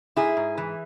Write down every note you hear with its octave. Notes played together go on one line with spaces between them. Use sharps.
G#2 E4 G#4
G#2
E3